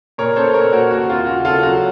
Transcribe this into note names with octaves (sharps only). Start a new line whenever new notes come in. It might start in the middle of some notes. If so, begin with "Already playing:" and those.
A#2 A#4 C#5
C#4 A4 C5
A#2 A#4 C#5
A#2 F#4 A#4
D#2 F#4
C4 F4
C#3 F#4
C#3 F4 A4
F#3 F#4